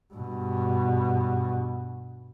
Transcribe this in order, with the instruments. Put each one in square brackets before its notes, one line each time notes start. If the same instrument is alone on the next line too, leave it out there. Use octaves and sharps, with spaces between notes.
[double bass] G2 B2